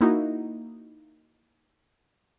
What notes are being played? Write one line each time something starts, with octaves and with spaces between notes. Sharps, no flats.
A#3 D#4 E4 F#4